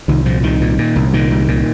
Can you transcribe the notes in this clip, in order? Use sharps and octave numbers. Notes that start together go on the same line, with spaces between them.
C2 D#3
A#2 F3
C2 D#3
A#2
A#2
C2
A#2 D#3
C2
A#2